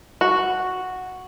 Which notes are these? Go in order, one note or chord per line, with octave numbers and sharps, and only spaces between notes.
F#4